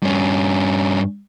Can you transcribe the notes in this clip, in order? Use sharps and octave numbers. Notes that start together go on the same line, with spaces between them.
G2 C#4